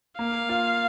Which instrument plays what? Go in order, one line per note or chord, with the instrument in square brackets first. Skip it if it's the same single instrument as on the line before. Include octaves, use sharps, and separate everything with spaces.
[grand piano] A#3 [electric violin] F5
[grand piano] F4